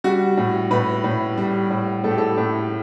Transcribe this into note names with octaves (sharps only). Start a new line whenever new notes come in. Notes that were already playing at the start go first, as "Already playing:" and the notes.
G3 F#4
A2
A2 B4
A2
G3
A2
A2 A4
G4
A4
A2